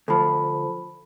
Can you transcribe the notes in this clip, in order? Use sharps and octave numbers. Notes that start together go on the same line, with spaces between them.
D2 F3 A4 A5 B5